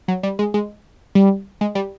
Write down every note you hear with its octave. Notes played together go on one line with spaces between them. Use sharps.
F#3
G3
G#3
G#3
G3
G#3
G3